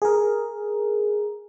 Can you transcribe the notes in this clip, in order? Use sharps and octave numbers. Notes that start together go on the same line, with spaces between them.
G#4 A#4